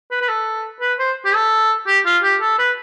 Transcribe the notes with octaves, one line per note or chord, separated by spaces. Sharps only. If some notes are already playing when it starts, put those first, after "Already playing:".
B4
B4
A4
B4
C5
G4
A4
G4
F4
G4
A4
B4